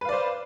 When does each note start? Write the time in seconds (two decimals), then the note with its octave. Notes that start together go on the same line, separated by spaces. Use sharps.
0.01 B4
0.05 F5
0.09 D5
0.13 C5